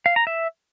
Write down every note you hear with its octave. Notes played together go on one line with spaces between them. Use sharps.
F5
A#5
E5